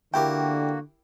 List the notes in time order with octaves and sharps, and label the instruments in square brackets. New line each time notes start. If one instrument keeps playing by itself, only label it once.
[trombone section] D3 [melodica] A#3 F#4 [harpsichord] E4 G4 A#4 [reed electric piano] G5